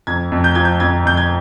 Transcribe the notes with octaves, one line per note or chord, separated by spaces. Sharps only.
F2 G#6
F2
G6
F3 G#6
G6
F2 G#6
F2 G6
G#6